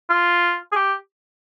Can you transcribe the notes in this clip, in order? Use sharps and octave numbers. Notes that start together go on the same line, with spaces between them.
F4
G#4
G4